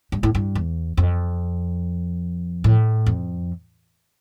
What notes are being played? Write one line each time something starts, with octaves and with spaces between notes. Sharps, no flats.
G2
A2
G2
E2
F2
A2
F2